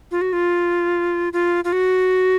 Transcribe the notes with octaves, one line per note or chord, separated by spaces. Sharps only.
F4
F#4
F4
F4
F4
F#4